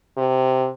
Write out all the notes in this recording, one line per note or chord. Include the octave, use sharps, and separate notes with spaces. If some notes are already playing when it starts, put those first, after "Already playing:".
C3